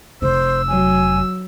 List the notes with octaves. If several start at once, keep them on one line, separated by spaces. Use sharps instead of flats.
F1 C5 E6
F#3 G#5